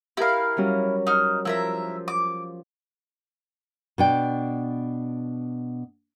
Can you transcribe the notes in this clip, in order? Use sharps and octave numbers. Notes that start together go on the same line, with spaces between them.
E4 G4 A#4 F5
F#3 G3 C#4
D#4 F6
F3 E4 A#4 E5
D6
B2 D4 G5